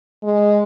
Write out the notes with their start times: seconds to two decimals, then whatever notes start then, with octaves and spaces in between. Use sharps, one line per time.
0.23 G#3